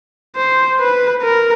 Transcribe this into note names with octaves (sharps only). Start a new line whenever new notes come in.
C5
B4
A#4